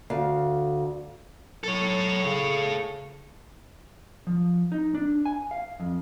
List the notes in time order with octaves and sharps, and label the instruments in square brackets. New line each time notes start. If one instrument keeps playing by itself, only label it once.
[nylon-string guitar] D2 F5
[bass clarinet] F#3 [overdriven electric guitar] A4 C#5
[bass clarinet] C#3
[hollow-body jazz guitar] F3
D#4
D4
G#5
F5
F2